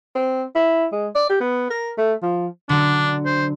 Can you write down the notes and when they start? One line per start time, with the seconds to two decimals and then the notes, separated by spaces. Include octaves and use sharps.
0.15 C4
0.55 E4
0.92 G#3
1.15 D5
1.29 G4
1.41 B3
1.70 A#4
1.98 A3
2.23 F3
2.69 D3 F#3 D4
3.25 C5